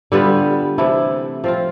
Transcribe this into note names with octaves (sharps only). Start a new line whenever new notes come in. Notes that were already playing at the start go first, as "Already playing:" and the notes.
D3 G3 B3 F4
C3 E3 A3 E4
F3 C4 F4